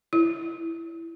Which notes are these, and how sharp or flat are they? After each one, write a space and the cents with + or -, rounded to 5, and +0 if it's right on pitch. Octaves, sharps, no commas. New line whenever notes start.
E4 +10